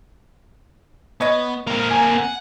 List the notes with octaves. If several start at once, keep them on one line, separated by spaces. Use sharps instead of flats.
B3 C#5 D#5
A#3 C4 A#4
G#5
F#5